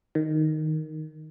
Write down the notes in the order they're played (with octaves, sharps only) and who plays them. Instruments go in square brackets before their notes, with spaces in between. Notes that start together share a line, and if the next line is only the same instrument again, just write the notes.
[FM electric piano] D#3